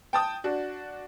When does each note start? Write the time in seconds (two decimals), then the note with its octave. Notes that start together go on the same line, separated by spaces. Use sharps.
0.13 G5 A5 D#6
0.44 D4 F#4